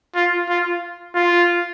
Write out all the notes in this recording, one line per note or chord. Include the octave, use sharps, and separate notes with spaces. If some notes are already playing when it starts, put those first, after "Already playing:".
F4
F4
F4